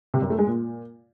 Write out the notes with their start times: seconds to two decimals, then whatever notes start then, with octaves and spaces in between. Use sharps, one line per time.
0.14 C3
0.22 F#2
0.30 A3
0.39 G#3
0.47 A#2